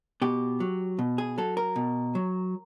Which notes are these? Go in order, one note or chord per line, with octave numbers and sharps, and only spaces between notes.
B2 G4
F#3
B2
G#4
F#3 A4
A#4
B2
F#3